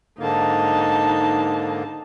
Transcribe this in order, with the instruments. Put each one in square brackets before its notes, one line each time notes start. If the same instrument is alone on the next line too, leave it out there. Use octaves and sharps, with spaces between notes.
[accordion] G#2 D3 A#3 [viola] D#4 A5